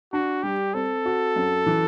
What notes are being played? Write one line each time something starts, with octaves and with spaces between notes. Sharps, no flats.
D4 F#4
G3 G4
C4 A4
F#4
F#2
E3